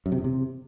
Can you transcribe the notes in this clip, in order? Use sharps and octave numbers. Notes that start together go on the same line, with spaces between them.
F#2
C3
E2
C3